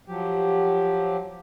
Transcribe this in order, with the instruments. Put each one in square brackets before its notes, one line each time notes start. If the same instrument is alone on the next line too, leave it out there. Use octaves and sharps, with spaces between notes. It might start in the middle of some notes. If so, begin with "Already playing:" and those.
[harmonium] F3 F#3 G4